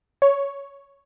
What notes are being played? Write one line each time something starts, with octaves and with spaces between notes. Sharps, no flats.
C#5